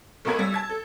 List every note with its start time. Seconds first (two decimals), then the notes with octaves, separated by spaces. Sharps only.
0.25 B1 A3 B3 A#4 B5 G#6
0.39 G3 E6
0.52 A5 G#6 A6
0.69 A4